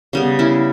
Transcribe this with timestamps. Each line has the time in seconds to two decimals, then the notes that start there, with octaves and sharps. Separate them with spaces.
0.13 C#3 G3 B3
0.39 C#4 E4